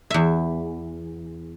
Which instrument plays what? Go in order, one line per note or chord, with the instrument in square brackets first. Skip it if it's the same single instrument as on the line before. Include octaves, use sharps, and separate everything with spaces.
[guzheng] E2 E5